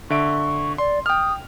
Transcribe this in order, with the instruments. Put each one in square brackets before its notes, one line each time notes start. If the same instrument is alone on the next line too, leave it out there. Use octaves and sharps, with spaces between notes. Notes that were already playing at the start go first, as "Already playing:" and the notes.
[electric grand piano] D3 E5 D7 [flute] C#6
[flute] D5 [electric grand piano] C6
[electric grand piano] G5 F6 [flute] D#6